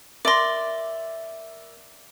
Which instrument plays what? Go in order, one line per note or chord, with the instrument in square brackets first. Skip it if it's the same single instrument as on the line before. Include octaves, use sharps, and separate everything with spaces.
[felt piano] A#4 E5 D7 [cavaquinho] D5 C6 [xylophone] D6 A#6